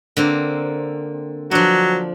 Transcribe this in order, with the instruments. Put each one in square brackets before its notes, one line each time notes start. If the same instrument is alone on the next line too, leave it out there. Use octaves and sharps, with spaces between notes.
[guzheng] D3 A#3 C4
[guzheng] F3 D4 [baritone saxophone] F#3